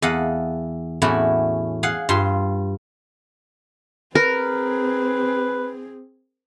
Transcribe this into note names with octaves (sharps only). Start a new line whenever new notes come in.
E2 A4 D#5 F5 F#5
E2 A2 C#4 E4 F#4
G#4 F5 F#5
G2 F4 C6
C4 G#4 A#4 B4